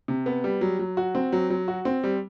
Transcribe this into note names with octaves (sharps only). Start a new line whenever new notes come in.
C3
B3
G3
F#3
F#3
F#4
C4
F#3
F#3
F#4
C4
G3